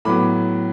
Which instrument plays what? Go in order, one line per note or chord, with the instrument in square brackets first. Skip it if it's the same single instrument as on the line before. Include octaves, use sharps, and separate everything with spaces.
[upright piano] A2 F#3 B3 B5 D6